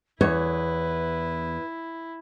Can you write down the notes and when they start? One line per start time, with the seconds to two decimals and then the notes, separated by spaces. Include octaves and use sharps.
0.21 E2 E4 B4 C#5